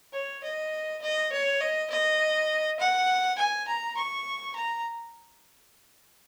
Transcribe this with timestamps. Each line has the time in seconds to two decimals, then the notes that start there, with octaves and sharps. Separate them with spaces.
0.13 C#5
0.43 D#5
1.02 D#5
1.32 C#5
1.61 D#5
1.90 D#5
2.79 F#5
3.38 G#5
3.68 A#5
3.97 C#6
4.56 A#5